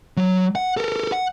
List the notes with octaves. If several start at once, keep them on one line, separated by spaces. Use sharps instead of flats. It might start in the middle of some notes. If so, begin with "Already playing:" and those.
F#3
F#5
A4 A#4
F#5